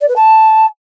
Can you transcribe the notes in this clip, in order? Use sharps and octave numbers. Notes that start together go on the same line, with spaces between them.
D5
B4
A5